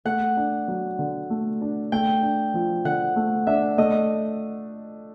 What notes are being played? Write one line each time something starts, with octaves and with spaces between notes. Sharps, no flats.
A3 F#5
D4
F#3
D3
A3
D4
A3 G5
D4
F3
D3 F#5
A3
D4 E5
A3 D#5